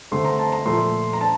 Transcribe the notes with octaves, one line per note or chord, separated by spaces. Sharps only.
D3 A3 C4 C6
A#5
A5
A#5
A#2 F3 A3 C6
A#5
D4 A5